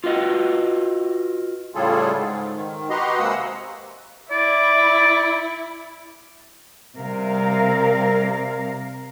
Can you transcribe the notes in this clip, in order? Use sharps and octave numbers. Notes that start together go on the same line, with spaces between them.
F4 F#4 B4 D#5
A2 C#3 G3 F4 G#4 A4
G#2
D#3
F#4 G4 B4 D#5 A#5 C6
C3 G#3 A#3 F#5 D#6 E6
E4 D5
C3 G3 A#4 F5